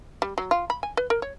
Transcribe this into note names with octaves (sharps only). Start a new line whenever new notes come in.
G3
F#3
F4
B5
G#5
B4
A#4
C#5